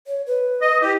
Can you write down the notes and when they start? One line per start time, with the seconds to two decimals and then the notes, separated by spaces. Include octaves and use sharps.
0.07 C#5
0.27 B4
0.61 D#5
0.81 E4 G4